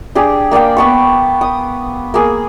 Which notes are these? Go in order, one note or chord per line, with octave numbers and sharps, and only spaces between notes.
D4 G4 G#4
A#3 D5 F5 G5
B3 A5 C#6
D#6
A#3 G#4